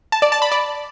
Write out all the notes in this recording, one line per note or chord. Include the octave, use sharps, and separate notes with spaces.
A5
D5
A5
B5
D5